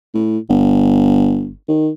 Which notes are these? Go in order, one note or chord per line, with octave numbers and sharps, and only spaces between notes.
A2
G1
D#3